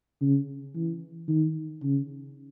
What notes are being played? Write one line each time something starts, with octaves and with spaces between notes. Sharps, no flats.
C#3
E3
D#3
C#3